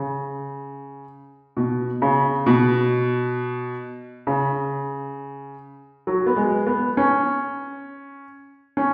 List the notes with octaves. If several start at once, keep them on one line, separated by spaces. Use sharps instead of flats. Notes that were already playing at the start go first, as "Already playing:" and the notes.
Already playing: C#3
B2
C#3
B2
C#3
F#3
B3
G#3
B3
C#4
C#4